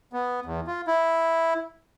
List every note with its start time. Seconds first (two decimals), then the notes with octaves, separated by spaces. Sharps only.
0.13 B3
0.46 E2
0.67 F4
0.87 E4